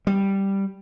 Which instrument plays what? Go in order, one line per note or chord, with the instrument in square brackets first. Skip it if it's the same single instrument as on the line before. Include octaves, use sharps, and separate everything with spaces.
[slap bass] G3